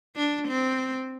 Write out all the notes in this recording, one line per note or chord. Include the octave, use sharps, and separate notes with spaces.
D4
C4